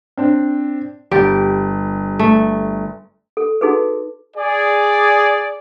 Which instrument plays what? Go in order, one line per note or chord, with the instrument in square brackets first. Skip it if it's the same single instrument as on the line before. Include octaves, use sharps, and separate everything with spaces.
[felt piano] C4 D4
[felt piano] G1 A6 [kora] G3 G4
[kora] A3
[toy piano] A4
D#4 F#4 G#4 A4 B4
[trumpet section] G#4 D5